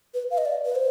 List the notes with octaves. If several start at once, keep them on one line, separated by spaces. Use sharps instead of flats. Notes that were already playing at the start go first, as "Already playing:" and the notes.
B4
F5
D#5
D5
B4
C5